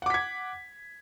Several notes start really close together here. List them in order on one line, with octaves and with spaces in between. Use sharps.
F#5 D6 B6 G#6